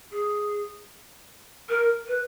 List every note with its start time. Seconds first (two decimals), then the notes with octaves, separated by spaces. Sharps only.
0.11 G#4
1.69 A#4
2.08 B4